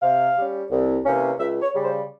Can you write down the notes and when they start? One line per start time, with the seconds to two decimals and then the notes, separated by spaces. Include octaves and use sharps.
0.02 C3 F5
0.37 G3 C#4
0.71 C2
1.05 C3 E3 A#3 C#4
1.39 C#2 E5
1.62 C#5
1.74 C#3 G3
1.85 C5